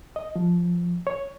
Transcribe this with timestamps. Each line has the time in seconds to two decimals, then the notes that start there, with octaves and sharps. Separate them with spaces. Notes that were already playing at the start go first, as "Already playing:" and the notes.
0.16 D#5
0.36 F3
1.07 C#5